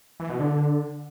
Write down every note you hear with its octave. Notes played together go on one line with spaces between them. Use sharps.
E3
B2
D3